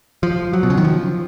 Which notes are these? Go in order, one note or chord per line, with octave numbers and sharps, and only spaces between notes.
F3
F#3
B2
C#3
D#3
F3